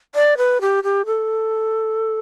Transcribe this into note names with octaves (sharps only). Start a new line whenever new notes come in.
D5
B4
G4
G4
A4